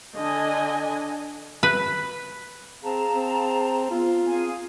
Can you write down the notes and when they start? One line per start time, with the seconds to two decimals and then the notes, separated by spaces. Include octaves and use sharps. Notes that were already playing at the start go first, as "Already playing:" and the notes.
0.16 D3 D#5 G#5
1.63 B4
2.83 C4 G#4 F5 A5 A#5
3.15 C4
3.91 B3 F4
4.27 C4 G#4 F5 G#5